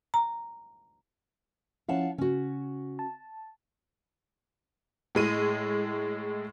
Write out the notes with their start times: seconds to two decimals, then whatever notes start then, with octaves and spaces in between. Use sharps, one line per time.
0.14 A#5
1.89 F3 C#4 E4 F5 F#5 A5
2.18 C#3 C#4 F#4
2.99 A5
5.15 A2 G#3 D#7